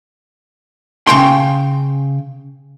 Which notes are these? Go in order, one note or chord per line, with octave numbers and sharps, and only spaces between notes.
C#3 G5 C6